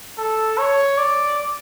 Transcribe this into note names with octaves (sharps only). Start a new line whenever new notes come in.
A4
C#5
D5